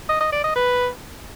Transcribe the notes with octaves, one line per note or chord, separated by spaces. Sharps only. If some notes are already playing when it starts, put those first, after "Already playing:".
D#5
D#5
D5
D#5
B4